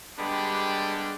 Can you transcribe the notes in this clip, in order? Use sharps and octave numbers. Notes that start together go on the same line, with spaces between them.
D3 G3 G#3 B3 D4 G4